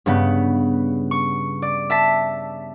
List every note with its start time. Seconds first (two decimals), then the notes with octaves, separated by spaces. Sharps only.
0.06 G2 C#3 B3
1.11 C#6
1.62 D5
1.90 E5 A5 B6